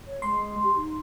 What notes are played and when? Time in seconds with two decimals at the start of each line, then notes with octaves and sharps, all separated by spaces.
0.07 C#5
0.22 G#3 C6
0.63 G4
0.76 D#4